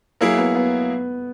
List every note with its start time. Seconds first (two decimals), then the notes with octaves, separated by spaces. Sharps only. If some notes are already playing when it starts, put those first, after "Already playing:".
0.21 F#3 A#3 E4 G#4
0.37 B3
0.55 B3